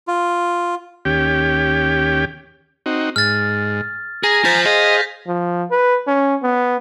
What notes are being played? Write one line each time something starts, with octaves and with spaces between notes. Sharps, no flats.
F4
D#2 C#4 G4 G5
C4 D#4 F#4
G#2 F6 A6
G#4 G#5 A#5 A#6
F4 C5 G6 A6 B6
G#4 C5 D#5 F5
F3
B4
C#4
B3